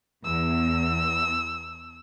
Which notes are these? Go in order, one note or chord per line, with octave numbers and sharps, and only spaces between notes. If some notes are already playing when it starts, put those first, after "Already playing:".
E2 E6